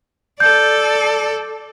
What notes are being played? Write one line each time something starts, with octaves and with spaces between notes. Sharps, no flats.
A4 D5 G6